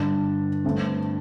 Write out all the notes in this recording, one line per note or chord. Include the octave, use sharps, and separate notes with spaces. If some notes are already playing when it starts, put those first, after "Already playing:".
Already playing: G2 D3 G3 D4
G2 D3 A3 C4